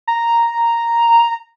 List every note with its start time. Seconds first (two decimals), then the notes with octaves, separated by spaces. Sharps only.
0.08 A#5